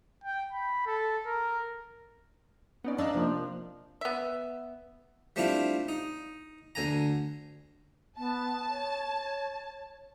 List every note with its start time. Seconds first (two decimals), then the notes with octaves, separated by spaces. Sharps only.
0.24 G5
0.53 B5
0.87 A4
1.26 A#4
2.84 B3 C#4 D#4 D5
2.98 D4 D#4 D#5 F5 A5 E6 F#6
3.14 C3 F3 A#3
4.01 B3 E5
5.36 G3 A3 C4 D4 E4 F4
5.89 D#4
6.75 D2 D3 G#5 A#5
8.17 B3 A5
8.68 C#5